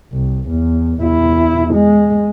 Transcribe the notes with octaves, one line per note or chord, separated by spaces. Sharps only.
C2
E2
E2 E4
G#3